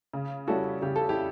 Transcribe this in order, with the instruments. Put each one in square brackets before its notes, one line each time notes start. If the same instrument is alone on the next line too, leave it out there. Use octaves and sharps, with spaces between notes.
[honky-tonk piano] C#3
[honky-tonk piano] G3 C#4 E4 [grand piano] F#4 A4
[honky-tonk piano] C#3 [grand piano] G4
[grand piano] A4
E4 G4